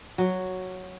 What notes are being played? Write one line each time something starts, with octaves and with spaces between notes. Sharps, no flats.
F#3